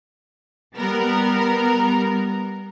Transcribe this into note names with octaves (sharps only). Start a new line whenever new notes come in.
G3 B3 A#4